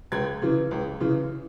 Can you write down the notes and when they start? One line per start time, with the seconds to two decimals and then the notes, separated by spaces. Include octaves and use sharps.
0.12 C#2 G#6
0.42 C#3 E3
0.71 C#2
1.00 C#3 E3